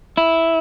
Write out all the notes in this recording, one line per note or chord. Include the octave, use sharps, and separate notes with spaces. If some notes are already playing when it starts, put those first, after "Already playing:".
E4